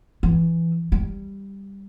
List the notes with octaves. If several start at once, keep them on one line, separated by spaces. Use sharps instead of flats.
E3
G3